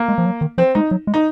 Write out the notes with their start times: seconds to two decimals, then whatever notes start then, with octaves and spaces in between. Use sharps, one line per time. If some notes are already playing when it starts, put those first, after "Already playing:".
Already playing: A#3
0.09 G#3
0.18 F3
0.26 F#3
0.41 D#3
0.58 F3 C4
0.75 G#3 D#4
0.91 F#3
1.07 G#3
1.14 D#4